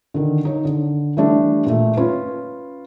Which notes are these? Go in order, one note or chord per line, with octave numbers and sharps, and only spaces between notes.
D3 D#3
D#4 C#5
D3
E3 G3 A3 D4
A#2 A3
C#4 F4 B4